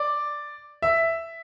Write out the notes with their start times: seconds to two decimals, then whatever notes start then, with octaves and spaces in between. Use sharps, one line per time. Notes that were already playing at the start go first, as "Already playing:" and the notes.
Already playing: D5
0.82 E5